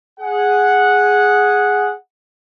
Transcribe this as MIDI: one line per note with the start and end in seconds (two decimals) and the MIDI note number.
0.19 1.92 68
0.19 1.92 78